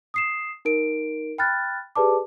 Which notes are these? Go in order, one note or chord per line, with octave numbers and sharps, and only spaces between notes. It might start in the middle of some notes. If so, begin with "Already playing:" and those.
D#6 C7 E7
D#4 A#4 D7
G5 B5 F6 F#6 A6
G4 G#4 B4 D5 A5 D6